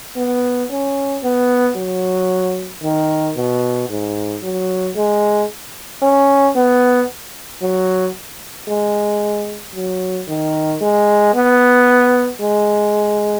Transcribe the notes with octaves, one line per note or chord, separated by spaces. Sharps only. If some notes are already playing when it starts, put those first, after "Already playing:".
B3
C#4
B3
F#3
D#3
B2
G#2
F#3
G#3
C#4
B3
F#3
G#3
F#3
D#3
G#3
B3
G#3